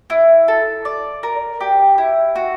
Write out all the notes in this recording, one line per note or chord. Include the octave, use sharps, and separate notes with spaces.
E4
A4
D5
A#4
G4
E4
F#4